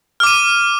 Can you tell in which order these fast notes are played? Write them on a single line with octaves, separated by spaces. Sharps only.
F6 D6 D#7